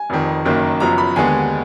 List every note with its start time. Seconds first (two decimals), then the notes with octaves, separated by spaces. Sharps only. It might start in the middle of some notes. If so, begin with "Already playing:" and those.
Already playing: G#5
0.10 F1 F2 D#3
0.45 F#1 F#2 D#3 A#3
0.80 F#1 F#2 F3 B3 A#5
0.98 B5
1.16 D#2 D3 G#3 B3 G#5